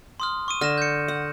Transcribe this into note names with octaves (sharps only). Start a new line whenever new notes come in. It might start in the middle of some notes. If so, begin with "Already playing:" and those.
C6 D#6 F6
C#6 D#6 D#7
D3 F6 A#6 E7
G6 C#7
F#5